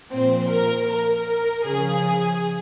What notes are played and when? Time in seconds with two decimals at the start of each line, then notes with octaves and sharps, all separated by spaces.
0.11 A#2 F3 C4
0.50 A#4
0.88 A#4
1.65 C#3 F3 G#4